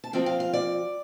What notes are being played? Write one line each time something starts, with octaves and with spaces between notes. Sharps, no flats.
A5
F3 C4 F4 G5
F5
F5
D5